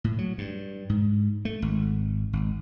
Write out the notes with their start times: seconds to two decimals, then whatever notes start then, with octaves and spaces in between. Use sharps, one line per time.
0.04 A2
0.18 F#3
0.38 G2
0.90 G#2
1.45 A3
1.62 G#1
2.33 G#1